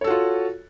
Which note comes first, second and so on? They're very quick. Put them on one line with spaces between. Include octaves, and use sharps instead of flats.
C#5 A4 F#4 F4